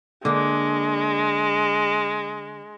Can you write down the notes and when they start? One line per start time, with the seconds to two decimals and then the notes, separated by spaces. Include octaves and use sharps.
0.25 D3 G#3 A#3